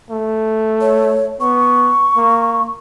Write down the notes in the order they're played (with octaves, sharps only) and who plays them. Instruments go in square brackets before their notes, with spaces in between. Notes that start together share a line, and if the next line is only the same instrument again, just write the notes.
[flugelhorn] A3
[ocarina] C#5
[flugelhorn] B3 [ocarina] C#6
[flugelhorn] A#3